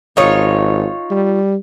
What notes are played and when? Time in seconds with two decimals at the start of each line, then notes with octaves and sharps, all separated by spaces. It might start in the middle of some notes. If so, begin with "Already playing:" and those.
0.17 G#1 D#4 F4 C#5
1.11 G3